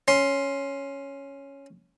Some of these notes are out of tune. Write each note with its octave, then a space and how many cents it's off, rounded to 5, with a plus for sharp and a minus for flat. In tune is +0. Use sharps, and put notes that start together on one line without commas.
C#4 +0 C6 +10